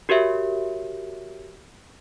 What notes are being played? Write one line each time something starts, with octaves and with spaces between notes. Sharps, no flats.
F#4 G4 A#4 C#5 E5